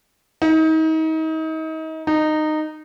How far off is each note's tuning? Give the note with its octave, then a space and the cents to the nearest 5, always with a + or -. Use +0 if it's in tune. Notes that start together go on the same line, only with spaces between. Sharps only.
D#4 +35
D#4 -15